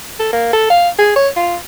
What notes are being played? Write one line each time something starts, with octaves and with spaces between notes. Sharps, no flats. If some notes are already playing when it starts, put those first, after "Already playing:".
A4
A#3
A4
F5
G#4
C#5
F4